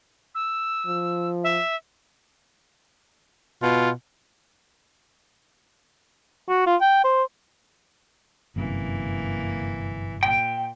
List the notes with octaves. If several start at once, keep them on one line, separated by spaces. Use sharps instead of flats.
E6
F3
E5
B2 F4
F#4
F4
G5
C5
G1 F#2 C3 E3 A#3
A#2 G5